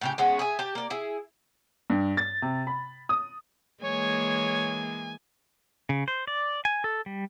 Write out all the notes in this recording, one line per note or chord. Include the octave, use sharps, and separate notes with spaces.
A2 C#3 G4
G#3 B3 C#4 F#4
G#4 E5 G#5
G4 A5
A#3 D5
E4 G#4
G2
A6
C3
B5
D#6
E3 G#3 A#3 C#5 G#5
C#3
C5
D5
G#5
A4
G3